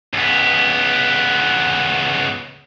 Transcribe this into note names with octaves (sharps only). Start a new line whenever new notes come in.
C#2 B3